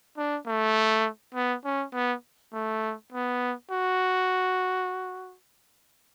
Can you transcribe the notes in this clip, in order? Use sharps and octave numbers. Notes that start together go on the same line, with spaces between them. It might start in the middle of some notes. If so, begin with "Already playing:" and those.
D4
A3
B3
C#4
B3
A3
B3
F#4